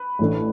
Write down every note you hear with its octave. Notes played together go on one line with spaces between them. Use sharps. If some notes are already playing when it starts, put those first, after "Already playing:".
Already playing: B4
A1 A2 E3 A3 D4